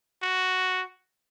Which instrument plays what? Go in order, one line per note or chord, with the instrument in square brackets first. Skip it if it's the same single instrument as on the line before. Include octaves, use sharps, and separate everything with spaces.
[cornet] F#4